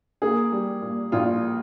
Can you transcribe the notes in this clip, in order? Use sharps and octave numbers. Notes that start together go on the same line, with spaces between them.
A#3 G#4
G3
A#2
A#1 F4